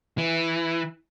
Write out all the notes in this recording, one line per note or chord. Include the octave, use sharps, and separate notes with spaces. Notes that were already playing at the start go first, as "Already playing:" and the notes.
E3